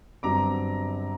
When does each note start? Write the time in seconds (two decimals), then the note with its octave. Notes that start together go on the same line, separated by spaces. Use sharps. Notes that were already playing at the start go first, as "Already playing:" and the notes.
0.23 G1 G2 F#3 C4 A#5 D6